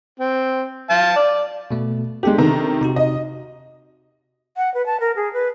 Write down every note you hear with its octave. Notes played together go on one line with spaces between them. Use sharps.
C4
F5 A5
D5
B2 A3
G#3 D4 G4 A4
C3 D#3 A#5
C3 D#4 F#4
D#5
F#5
B4
A5
A#4
G#4
B4